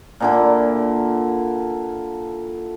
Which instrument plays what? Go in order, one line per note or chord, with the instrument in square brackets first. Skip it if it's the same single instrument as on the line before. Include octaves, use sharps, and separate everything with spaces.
[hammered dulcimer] A#2 D3 E4